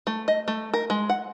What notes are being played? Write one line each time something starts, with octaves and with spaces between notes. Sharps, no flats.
A3
D#5
A3
A#4
G#3
F#5